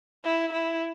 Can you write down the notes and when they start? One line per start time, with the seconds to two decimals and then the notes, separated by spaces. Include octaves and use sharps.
0.24 E4
0.52 E4